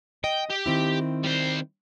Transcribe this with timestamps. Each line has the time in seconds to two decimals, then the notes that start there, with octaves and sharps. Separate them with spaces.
0.24 D#5 G5
0.50 G4
0.66 D#3 C4 E4
1.23 G3 C5